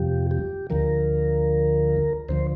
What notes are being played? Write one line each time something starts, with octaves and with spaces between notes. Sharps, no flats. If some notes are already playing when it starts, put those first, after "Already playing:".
Already playing: F2 C3 F3 G4
G4
D2 D3 F3 A#4
D2 D3 F3 C5